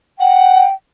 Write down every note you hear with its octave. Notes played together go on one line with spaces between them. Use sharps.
F#5 G5